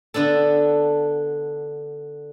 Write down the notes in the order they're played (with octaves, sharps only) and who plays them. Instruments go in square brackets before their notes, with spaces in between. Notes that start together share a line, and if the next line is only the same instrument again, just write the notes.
[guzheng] D3 B3 D4 A4